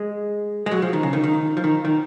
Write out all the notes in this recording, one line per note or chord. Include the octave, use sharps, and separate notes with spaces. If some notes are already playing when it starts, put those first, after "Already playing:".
Already playing: G#3
G#3
F#3
F3
D#3
C#3
D#3
D#3
F3
D#3
D#3